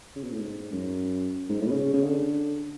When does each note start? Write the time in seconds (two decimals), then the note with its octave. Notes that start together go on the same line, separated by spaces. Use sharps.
0.16 C#3
0.24 B2
0.32 A2
0.39 G#2
0.73 F#2
1.49 G#2
1.61 A2
1.67 B2
1.72 C#3
1.93 C#3
2.04 D3